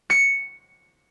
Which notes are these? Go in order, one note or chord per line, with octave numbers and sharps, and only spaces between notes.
C#7